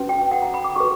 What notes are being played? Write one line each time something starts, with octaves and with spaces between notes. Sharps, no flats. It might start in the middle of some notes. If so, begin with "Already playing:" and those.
Already playing: C#4 F#4 B4
G5
F#5
A#5
B5
D6
F#4 B4 C#6